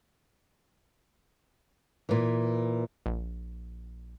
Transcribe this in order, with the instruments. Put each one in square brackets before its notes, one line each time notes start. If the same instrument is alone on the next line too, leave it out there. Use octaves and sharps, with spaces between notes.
[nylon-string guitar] A#2 E3
[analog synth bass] A#1